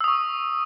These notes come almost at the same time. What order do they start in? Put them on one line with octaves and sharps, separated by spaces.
E6 D#6 C#6